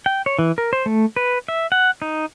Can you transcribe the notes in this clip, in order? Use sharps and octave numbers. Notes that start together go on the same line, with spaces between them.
G5
C#5
E3
A#4
C5
A3
B4
E5
F#5
D#4